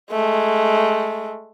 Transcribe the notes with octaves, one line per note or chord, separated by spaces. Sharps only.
G#3 A3